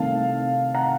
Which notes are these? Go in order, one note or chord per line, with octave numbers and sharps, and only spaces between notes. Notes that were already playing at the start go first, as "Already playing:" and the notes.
Already playing: C2 C3 D#3 A3 C4 F5 A5
F#5 A#5